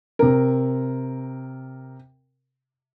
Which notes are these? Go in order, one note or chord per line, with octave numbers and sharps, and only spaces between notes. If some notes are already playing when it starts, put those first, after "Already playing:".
C3 A#4